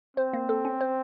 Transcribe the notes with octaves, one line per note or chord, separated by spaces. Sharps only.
C4 C5
A#3
A4
C#4
C5